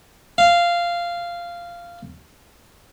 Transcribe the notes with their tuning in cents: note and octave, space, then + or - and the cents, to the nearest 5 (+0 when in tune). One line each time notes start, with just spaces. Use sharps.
F5 -10